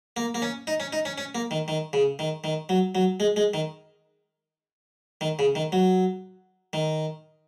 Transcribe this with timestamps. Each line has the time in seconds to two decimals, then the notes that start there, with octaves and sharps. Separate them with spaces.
0.17 A#3
0.35 A#3
0.42 C#4
0.67 D#4
0.80 C#4
0.93 D#4
1.05 C#4
1.18 C#4
1.35 A#3
1.51 D#3
1.68 D#3
1.93 C#3
2.19 D#3
2.44 D#3
2.69 F#3
2.95 F#3
3.20 G#3
3.36 G#3
3.54 D#3
5.21 D#3
5.39 C#3
5.55 D#3
5.72 F#3
6.73 D#3